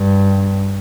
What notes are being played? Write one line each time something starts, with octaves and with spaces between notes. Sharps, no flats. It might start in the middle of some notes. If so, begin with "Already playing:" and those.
Already playing: G2